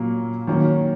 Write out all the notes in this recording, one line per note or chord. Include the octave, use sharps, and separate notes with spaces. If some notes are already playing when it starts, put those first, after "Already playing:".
Already playing: A#2 F#3 A#3 C#4
D#3 F#3 A#3 C#4